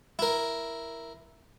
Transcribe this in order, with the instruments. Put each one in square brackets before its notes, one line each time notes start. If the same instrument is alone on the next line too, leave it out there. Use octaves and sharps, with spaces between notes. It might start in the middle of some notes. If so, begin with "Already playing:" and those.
[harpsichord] E4 A#4